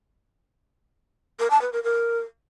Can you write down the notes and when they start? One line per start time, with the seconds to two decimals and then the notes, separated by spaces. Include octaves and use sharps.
1.39 A#4
1.50 A5
1.62 B4
1.73 A#4
1.84 A#4